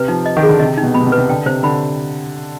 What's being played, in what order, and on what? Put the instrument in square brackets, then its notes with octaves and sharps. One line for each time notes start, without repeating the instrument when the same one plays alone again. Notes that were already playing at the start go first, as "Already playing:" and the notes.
Already playing: [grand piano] C3 [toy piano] B4
[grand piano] F3 [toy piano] D#4
[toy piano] D#5
[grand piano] D#3
[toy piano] G#4
[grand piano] D3
[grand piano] C3 [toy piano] D#5
[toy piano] D#4
[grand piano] B2
[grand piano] B2 [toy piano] B5
[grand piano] C3
B2
[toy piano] B4
[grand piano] C3
[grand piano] D3 [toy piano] G5
[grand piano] C3 [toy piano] C5
[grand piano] D3 [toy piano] B5